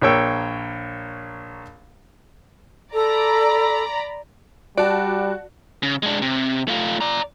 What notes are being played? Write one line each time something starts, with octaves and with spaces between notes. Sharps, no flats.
A#1 A#3 C#5 G5 E6
A4 D5 A#5 B5
G3 F#4 D5 A5
C#3
G#3 D4
C3
A3 F4
D5 A#5